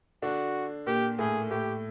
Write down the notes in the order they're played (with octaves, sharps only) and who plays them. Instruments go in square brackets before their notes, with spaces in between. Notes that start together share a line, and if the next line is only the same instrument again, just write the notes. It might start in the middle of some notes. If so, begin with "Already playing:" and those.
[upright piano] D3 D4 [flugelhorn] F#4
[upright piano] A#2 A#3 [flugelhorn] G4
[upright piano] A2 A3 [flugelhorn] G#4
[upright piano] A2 A3 [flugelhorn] G4